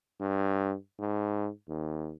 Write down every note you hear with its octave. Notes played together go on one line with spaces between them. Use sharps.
G2
G#2
D#2